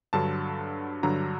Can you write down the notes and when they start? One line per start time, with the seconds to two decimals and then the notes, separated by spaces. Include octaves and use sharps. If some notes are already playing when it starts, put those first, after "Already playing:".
0.13 G2 D3 F#3 A5
1.03 G2 D3 F#3 A#5